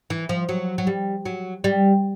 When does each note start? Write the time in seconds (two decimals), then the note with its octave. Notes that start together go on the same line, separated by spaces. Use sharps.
0.10 E3
0.29 F3
0.49 F#3
0.78 F#3
0.87 G3
1.25 F#3
1.64 G3